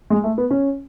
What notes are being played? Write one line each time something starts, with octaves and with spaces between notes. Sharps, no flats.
G#3
A3
B3
C#4